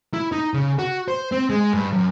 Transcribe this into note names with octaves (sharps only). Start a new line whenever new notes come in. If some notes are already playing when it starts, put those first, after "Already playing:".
E4
D#4
C#3
F#4
C5
C4
G#3
G2
F#2